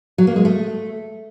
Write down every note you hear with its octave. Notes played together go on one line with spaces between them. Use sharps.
F#3
A#3
G#3
A3